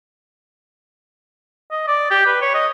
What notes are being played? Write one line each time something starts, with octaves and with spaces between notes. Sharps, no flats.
D#5
D5
G4
B4
C#5
D#5